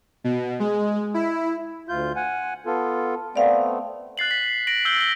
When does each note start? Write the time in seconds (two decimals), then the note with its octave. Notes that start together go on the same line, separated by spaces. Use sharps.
0.24 B2
0.60 G#3
1.14 E4
1.89 D2 F4 G6
2.16 F#5 G#5
2.66 B3 F4 A4
3.36 A3 B3 C4 D5 F5
4.18 F#6 A6 C7 F#7
4.31 B6
4.67 A#6 D7 F#7
4.85 E6 G6 D7 G7
4.98 A#6 G7